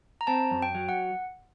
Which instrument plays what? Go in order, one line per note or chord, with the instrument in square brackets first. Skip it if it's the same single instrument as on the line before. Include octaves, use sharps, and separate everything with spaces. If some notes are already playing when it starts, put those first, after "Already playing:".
[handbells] A#5
[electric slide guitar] C4 [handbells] A5
[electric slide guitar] F#2
[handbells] G5
[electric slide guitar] F#3
[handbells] F#5